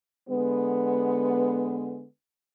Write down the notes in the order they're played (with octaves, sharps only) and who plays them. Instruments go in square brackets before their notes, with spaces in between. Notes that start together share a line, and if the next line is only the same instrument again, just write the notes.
[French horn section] D3 G#3 B3